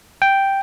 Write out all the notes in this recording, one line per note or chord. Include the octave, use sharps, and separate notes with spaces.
G5